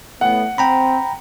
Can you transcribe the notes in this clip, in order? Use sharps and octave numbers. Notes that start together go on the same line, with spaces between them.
A2 B3 F#5
C4 G5 A#5 B5